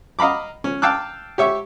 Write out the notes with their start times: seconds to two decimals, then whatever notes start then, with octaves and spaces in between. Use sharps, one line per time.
0.19 D#5 F5 A#5 B5 D6
0.64 C#4
0.82 F5 G5 A5 D6 E6 F#6
1.38 G4 C#5 E5